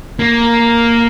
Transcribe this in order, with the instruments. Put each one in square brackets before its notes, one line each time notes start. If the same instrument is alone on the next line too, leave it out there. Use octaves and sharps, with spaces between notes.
[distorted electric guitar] A#3